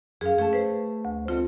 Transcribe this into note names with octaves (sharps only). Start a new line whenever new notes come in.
F#2 G#4 F5
A3 G#4 A5
B4 C5
D2
C4 F4 A4 D#5